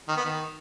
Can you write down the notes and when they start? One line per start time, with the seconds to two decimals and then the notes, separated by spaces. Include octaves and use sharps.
0.08 D#3
0.17 B3
0.25 D#3